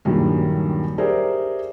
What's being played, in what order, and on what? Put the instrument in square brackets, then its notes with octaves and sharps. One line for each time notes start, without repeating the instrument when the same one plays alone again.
[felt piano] D#1 A#1 G2 D#3 F#3
G4 G#4 A#4 C5 D5 E5